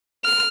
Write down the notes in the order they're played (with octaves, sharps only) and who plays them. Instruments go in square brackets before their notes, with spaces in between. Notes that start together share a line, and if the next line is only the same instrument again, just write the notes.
[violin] F6